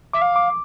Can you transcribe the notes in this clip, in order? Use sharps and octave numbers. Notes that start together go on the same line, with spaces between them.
E5 D6
F5
D6